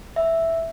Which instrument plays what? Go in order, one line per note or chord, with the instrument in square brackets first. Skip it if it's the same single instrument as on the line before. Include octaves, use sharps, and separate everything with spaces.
[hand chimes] E5